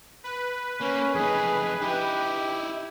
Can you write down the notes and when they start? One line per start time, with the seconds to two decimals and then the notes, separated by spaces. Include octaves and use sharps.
0.24 B4
0.81 A#3 C#4
1.15 F2 D#4 G#4
1.82 D#4 E4 G4